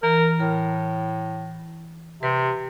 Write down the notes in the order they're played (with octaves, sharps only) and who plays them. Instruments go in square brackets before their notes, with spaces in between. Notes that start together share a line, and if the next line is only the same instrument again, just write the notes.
[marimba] E3 [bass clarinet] A#4
[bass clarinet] A2 [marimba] A#4 F6
[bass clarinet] C3 [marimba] G4 B4